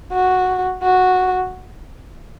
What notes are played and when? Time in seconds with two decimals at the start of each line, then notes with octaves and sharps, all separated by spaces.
0.12 F#4
0.82 F#4